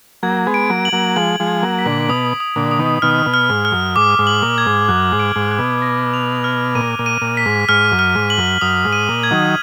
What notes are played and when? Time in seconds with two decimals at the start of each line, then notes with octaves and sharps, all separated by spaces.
0.23 F#3 A#3 G#6
0.47 G#3 B3
0.54 D7
0.70 F#3 A#3
0.85 F#7
0.93 F#3 A#3
1.16 F3 G#3 F#7
1.40 F3 G#3
1.47 G#6
1.62 F#3 A#3
1.79 B6
1.86 A#2 D3
2.09 B2 D#6
2.40 D#6
2.56 A#2 D3
2.71 D#6
2.79 B2 D#3
3.02 B2 D#3 F6
3.26 B2
3.34 F6
3.49 G#2
3.65 F6
3.72 F#2
3.96 G#2 D6
4.19 G#2
4.27 F#7
4.42 A#2
4.58 G#6
4.66 G#2
4.88 F#2 F#6
5.12 G#2
5.20 D7
5.36 G#2
5.51 F#6
5.59 B2
5.82 A#6
6.14 F7
6.44 F6
6.75 A#2 D#7
6.99 A#2
7.06 D#7
7.22 A#2
7.37 B6
7.46 G#2
7.69 G#2 F6
7.92 F#2
7.99 F6
8.15 G#2
8.30 F#7
8.38 F#2
8.61 F#2 D#6
8.85 G#2
8.92 D#7
9.09 A#2
9.23 G#6
9.31 D#3 F#3